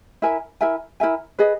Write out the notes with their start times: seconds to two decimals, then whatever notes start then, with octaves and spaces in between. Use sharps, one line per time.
0.22 E4 A#4 E5 G#5
0.61 E4 A#4 E5 G#5
1.00 E4 A#4 E5 G#5
1.39 G#4 B4 D#5